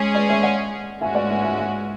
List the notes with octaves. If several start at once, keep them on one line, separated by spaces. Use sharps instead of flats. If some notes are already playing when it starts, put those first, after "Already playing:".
Already playing: G#3 C#4 G#4
B4 D5
C#5 E5
D5 F#5
G#2 G#3 C#4 F#4 E5 G#5
D5 F#5
E5 G#5
E5 G#5
E5 G#5